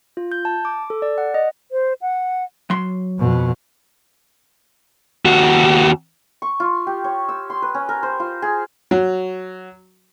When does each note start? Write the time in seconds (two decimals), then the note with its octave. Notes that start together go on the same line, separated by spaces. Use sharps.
0.17 F4
0.32 G6
0.45 A5
0.65 D6
0.90 A4
1.02 D5
1.18 F#5
1.34 D#5
1.71 C5
2.01 F#5
2.70 F#3 C6
3.19 F2 B2
5.25 D#2 F#4
6.42 C#6
6.60 F4
6.87 G4
7.04 C#5
7.29 E6
7.50 C6
7.62 B4
7.74 C#4
7.89 A#4
8.03 C5
8.20 F4
8.42 G#4
8.91 F#3